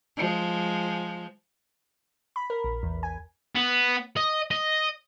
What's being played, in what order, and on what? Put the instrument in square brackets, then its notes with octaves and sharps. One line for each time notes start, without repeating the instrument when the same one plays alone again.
[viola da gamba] F3 G#3
[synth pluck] B5
A#4
A#1
E2
G#5
[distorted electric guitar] B3
D#5
D#5